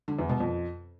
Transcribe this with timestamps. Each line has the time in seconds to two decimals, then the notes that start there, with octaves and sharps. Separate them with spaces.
0.08 D3
0.19 E2
0.29 B2
0.40 F2